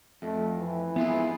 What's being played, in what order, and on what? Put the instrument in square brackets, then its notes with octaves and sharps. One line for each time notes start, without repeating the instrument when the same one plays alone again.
[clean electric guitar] F2 [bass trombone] A3
[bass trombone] E3
[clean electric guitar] G#2 F4 G#4 [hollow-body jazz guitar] B3 [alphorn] E4